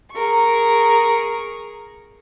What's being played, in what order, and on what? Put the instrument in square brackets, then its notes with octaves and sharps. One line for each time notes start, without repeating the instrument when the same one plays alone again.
[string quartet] G#4 A#4 C#6